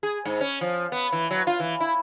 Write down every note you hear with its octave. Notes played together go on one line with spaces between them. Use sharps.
G#4
G#2
C#4
F3
B3
E3
F#3
F4
E3
E4